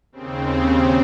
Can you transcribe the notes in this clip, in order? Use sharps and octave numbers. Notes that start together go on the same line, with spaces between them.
D#2 C#3 C4